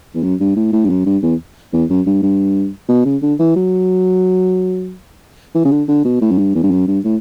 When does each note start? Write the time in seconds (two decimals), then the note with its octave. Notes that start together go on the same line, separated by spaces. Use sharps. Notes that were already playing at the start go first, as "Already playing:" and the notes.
0.15 E2
0.23 F#2
0.40 G2
0.56 A2
0.73 A2
0.84 G2
0.90 F#2
1.06 G2
1.23 E2
1.73 E2
1.89 F#2
2.06 G2
2.22 G2
2.89 B2
3.05 C#3
3.22 D3
3.39 E3
3.56 F#3
5.55 E3
5.65 C#3
5.72 D3
5.88 D3
6.05 B2
6.21 A2
6.31 F#2
6.38 G2
6.55 E2
6.63 G2
6.71 F#2
6.88 G2
7.04 A2